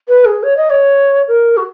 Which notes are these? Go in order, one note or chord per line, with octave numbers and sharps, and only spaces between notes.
B4
G#4
C#5
D#5
C#5
A#4
F#4